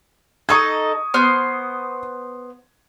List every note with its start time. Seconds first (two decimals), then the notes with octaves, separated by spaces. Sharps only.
0.49 D#4 A4 C#6 D#6 G#6
1.14 B3 C5 F6